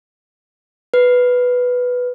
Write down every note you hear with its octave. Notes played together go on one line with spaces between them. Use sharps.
B4